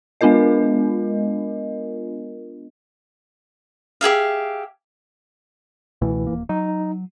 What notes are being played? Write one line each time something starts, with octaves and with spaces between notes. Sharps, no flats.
G#3 B3 D4 F4 A#4 D#5
G4 G#4 E5 F5
C#2 B2 E3 A3
D#1 F#2 A#3
F#3 D#4